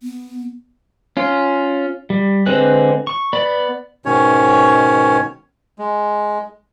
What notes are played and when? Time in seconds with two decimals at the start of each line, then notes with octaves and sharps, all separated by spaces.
0.03 B3
1.17 C#4 F4
2.10 G3
2.46 D3 G#3 C4 B4 F#6
3.07 C#6
3.33 B3 D5 B5
4.06 G#2 B2 D#3 C#4 C#5
5.79 G#3